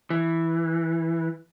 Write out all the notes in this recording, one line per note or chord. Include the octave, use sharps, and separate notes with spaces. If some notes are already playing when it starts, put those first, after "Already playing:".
E3